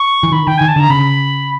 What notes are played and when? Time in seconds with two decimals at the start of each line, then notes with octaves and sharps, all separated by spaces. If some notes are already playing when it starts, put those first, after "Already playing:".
Already playing: C#6
0.23 E3
0.32 D#3 B5
0.47 D#3 G5
0.58 D#3 G#5
0.68 A5
0.76 D3 A#5
0.90 C#3 B5